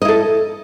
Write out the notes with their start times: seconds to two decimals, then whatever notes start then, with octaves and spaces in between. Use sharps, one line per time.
0.02 D#5
0.05 E4
0.08 A4